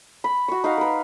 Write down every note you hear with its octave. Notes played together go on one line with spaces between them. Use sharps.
B5
F#4 C#6
D#4 F5 F#5
A#4 B4